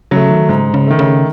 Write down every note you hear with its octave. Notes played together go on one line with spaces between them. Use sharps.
C#3 F#3 A3
D#3
G#2 C#3
C#3
D#3 A3
C#3